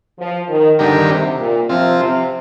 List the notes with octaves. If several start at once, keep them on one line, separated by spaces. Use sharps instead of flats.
F3
D#3
D3 D#3 G3 D4 G4 A#4
C3
A#2
C3 F3 C4 F4
C3